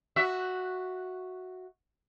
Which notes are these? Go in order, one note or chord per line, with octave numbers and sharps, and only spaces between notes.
F#4 E5